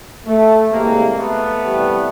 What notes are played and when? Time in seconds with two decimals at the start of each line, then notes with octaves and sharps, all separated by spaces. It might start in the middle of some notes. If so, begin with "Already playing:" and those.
0.27 A3
0.72 C3 E3 G3 G#3 A#3
1.20 A3 B3
1.65 C3 E3 G3